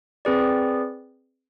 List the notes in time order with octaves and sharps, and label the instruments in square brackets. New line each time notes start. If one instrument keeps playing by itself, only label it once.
[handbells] C4 G#4 B4 D5